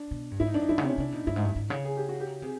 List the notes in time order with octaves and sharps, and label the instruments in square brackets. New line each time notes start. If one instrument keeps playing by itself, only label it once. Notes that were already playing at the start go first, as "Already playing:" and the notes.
Already playing: [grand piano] D4
[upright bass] B2
G2
[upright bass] G#2 [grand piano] E4
[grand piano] D#4
[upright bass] F#2 [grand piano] D4
[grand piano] D#4
[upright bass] G2 [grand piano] E4
[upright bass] C#3
[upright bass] C3 [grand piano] C#4
[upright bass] C3 [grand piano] D4
[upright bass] B2 [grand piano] D#4
[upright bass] G2 [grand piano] E4
[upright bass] G#2
G2
G#2
C#3
[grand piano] G#4
G4
F#4
G4
[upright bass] C3 [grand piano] G#4